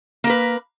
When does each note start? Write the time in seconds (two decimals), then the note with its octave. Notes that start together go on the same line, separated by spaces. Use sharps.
0.24 A#3
0.27 A#4
0.30 B4